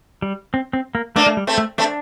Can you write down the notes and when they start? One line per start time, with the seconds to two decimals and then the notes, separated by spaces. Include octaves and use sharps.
0.22 G3
0.54 C4
0.73 C4
0.95 A#3
1.16 A3 A#3 D4
1.26 A3
1.37 G3
1.47 A3 C4
1.58 A3
1.78 A3 C4 D4